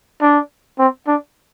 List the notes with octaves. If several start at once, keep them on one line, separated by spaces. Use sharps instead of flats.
D4
C4
D4